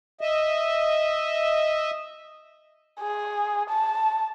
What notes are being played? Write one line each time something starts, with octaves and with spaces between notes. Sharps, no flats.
D#5 E5
G#4
A5